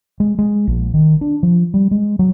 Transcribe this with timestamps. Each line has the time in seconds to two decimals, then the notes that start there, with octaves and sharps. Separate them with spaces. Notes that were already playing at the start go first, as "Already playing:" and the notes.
0.20 G#3
0.39 G#3
0.67 A#1
0.94 D#3
1.21 D4
1.43 F3
1.74 G3
1.91 G#3
2.19 F#3